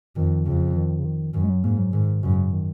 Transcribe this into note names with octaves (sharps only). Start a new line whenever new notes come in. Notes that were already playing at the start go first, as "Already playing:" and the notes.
F2 D#3
F2 C#3
D#3
C#3
D#3
F#2 D#3
G#3
F#3
G#2 A#3
F#3
G#2 D#3
F#2 C#3
D#3